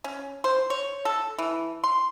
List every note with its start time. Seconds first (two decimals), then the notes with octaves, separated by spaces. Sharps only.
0.04 C#4
0.44 C5
0.70 C#5
1.05 A4
1.38 E3
1.84 C6